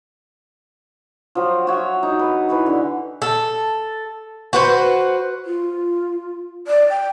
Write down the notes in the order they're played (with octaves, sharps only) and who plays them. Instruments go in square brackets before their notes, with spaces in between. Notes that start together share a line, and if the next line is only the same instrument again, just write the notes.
[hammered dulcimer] F3 F#3
F#4 C#5 E5
D#4
B4
E3 B4 C#5
D3
[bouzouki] A4
F#4 B4 C5
[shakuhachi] F4
D5
G5